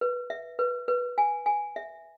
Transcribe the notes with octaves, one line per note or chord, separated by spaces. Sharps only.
B4
E5
B4
B4
G#5
G#5
E5